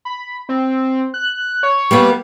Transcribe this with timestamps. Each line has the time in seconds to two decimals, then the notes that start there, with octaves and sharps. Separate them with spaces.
0.05 B5
0.49 C4
1.14 F#6
1.63 C#5
1.91 G3 A#3 B3